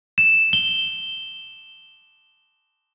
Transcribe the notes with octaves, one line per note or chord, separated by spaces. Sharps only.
E7
G7